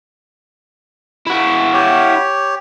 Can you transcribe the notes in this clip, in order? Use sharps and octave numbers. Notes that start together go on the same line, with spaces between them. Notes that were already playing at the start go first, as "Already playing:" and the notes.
E4 F#4
G4 C#5